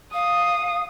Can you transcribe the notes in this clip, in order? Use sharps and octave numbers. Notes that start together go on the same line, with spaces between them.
F5 D#6